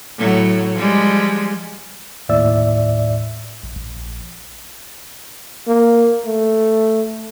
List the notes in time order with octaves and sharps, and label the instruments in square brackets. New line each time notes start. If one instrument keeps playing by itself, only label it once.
[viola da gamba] A2 F#3
F3 G3 G#3
[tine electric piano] A#1 D#2 A2 D5 E5 E6
[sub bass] A#1
A#1
[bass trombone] A#3
A3